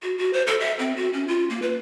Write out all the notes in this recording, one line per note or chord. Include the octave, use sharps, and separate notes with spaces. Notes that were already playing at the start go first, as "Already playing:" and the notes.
F#4
F#4
C5
A4
E5
C4
F#4
C#4
F4
A#3
B4